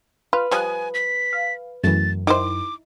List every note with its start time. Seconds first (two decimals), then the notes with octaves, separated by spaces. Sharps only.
0.33 F4 B4 F6
0.51 F3 G3 F5 G#5 D#6 F#6
0.94 B6
1.33 F5
1.84 F#2 E3 A3 A6
2.27 D#3 D#4 E4 C5 D6